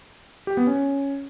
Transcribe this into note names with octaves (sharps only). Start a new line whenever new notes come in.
G4
B3
C#4